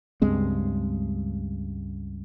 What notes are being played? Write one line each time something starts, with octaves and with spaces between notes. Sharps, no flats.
C#2 G2 G#3 C4